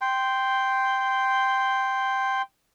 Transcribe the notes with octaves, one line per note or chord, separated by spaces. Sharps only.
G5 C6